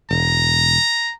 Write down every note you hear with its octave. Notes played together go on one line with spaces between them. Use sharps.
E1 A#5